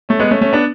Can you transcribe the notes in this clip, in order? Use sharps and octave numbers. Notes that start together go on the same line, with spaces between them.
A3 C#4
G#3 B3
A3 C#4
A3 C#4
B3 D4